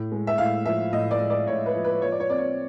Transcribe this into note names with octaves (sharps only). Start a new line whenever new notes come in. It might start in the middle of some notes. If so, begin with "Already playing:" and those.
Already playing: A2
G#3
E5
A2 F5
F3 E5
A2 D#5
D5
G#3
D5
A2 C#5
B4
F3
B4
F3 C#5
D5
C#5
C4 D5
C#5